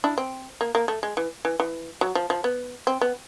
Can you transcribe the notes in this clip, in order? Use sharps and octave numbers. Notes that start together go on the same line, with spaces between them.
D4 E4
C4
A#3
A#3
A3
G#3
E3
E3
E3
F#3
F3
F3
B3
C4
B3